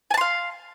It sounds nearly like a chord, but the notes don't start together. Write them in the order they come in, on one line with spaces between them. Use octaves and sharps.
G#5 A5 C6 F5